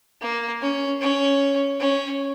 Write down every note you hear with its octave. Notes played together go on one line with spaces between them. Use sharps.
A#3
C#4
C#4
C#4